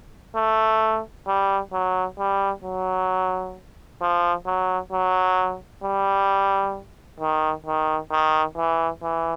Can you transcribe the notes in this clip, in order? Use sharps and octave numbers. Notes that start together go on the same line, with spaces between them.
A3
G3
F#3
G3
F#3
F3
F#3
F#3
G3
D#3
D#3
D#3
E3
E3